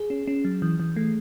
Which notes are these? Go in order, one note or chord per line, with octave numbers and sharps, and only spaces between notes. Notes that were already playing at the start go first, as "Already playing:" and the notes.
Already playing: G#4
C#4
C#4
F#3
E3
E3
A3